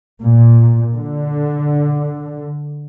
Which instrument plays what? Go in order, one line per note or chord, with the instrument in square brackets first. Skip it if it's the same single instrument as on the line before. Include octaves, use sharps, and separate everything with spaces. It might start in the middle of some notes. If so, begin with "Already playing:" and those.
[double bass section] A#2
D3